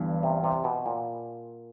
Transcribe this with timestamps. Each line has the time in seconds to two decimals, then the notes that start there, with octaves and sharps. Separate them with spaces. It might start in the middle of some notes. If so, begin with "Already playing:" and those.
Already playing: G1 G2 E3
0.23 C3
0.44 C3
0.64 B2
0.86 A#2